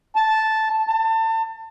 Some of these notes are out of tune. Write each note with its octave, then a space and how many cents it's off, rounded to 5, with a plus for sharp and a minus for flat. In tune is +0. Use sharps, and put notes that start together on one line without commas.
A5 -5
A5 +30